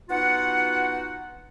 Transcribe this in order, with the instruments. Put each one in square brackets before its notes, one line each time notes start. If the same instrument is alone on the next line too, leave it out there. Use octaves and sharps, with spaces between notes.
[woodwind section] B3 D#4 F4 F#4 F#5